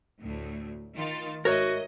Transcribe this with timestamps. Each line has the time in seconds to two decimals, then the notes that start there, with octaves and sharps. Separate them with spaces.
0.21 D2 A2
0.96 D#3 F4 A6
1.45 G#2 F#4 A#4 C#5 D#5 E5